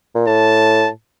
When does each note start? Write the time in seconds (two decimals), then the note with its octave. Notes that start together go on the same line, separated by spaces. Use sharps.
0.15 A#2
0.27 A2 A5